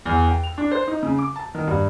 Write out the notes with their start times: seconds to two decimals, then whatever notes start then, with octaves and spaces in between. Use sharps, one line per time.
0.06 E2
0.27 G5
0.43 F7
0.58 D4
0.72 C5
0.88 D#4
1.03 C#3
1.19 D6
1.36 A5
1.55 D#3
1.67 G2